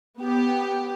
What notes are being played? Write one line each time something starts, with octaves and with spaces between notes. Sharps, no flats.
B3 G4